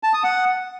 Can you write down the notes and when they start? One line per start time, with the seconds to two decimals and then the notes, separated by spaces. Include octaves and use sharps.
0.03 A5
0.13 D#6
0.24 F#5